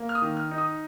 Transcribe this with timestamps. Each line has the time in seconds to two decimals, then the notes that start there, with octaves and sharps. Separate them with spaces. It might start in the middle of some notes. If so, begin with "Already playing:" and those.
Already playing: A#3
0.09 F6
0.15 D#6
0.22 D#3
0.37 F6
0.51 D#4
0.58 D#6